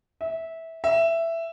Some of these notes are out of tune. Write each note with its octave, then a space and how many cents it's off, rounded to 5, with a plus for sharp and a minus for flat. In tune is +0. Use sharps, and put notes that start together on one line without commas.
E5 -15
E5 +10